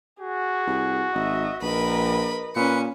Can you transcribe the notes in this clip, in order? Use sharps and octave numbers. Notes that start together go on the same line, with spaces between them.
F#4 G#4
C2
G#1 D#5 E5
A#1 A#4 B4 D#5 B5
A#2 C#4 B4 C#7